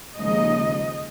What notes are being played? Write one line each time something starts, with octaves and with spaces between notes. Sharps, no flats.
D#2 C#3 F3 G#3 D#4 D#5